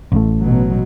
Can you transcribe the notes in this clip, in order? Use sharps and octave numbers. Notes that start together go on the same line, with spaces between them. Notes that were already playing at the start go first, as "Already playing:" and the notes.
A1 A2 A3
B2 F#3